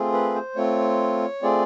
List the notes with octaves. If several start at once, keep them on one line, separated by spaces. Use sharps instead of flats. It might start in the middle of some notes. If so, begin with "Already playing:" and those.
Already playing: A3 C4 F4 G#4
B4
C5
A3 C4 F4 C#5
A3 C4 F4 G#4 D5